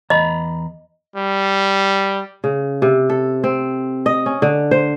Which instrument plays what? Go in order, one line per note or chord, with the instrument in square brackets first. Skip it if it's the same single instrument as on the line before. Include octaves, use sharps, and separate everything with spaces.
[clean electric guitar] E2 A#5 B5 [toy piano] D#5
[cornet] G3
[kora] C#3
C3
A4
C4
D#5
C#4
D3
C5